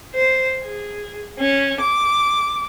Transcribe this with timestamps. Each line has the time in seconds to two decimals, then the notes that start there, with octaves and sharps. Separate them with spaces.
0.15 C5
0.65 G#4
1.39 C#4
1.81 D6